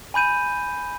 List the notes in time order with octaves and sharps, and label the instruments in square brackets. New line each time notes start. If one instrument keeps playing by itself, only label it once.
[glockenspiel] G#5 B5 G6 D#7